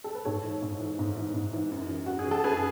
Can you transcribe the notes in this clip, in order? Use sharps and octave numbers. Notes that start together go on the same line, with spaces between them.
A4
B4
G#2 A4 C#5
E3
G#2
E3
G#2
E3
G#2
E3
F#2
E3
F#2 F#4
G#4
E3
A4
F#2 G#4 B4